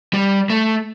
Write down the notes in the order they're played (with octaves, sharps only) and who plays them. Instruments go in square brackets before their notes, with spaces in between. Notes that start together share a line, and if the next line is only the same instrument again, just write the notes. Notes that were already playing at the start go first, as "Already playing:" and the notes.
[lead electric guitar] G3
A3